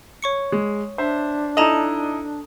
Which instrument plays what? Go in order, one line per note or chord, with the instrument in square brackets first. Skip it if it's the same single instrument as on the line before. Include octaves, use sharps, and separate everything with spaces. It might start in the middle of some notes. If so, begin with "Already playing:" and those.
[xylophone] C#5 C#6 C#7
[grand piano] G#3
[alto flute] D4 [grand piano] C5 E5
[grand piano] D#4 E4 D#5 [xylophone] A4 A5 A#5